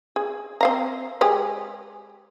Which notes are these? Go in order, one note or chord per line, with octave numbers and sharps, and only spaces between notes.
G#4
C4 F5 A#5
G#3 G4 G#4